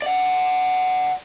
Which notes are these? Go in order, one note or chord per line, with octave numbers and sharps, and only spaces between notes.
D5 F#5